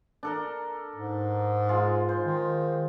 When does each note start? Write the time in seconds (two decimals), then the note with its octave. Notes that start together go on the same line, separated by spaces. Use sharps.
0.23 D4 A4 A#4
0.96 G#2
1.69 G#3 F4
2.09 C5
2.24 D#3